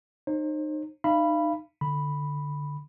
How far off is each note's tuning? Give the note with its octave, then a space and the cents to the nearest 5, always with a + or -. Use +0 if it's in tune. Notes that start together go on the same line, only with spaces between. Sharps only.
D#4 -30 C5 +35
D#4 -30 F5 -35 B5 +0
D3 +0 B5 +0